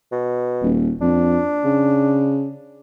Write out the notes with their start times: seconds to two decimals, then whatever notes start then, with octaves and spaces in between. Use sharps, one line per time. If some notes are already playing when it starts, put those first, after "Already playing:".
0.12 B2
0.62 D#1
1.01 F2 D4
1.65 C#3